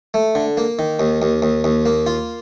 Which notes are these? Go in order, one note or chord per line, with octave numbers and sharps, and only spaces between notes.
A3
D3
A#3
D#3
D#2
D#2
D#2
D#2
A#3
F4